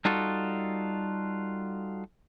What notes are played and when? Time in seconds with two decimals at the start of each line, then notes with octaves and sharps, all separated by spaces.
0.05 G3 D#4 F4 F#4 A4